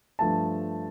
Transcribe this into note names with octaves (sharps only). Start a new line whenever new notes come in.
G2 F3 A3 A5